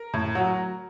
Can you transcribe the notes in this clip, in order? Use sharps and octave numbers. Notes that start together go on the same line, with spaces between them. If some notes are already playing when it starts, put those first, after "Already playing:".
Already playing: A#4
A2
F#3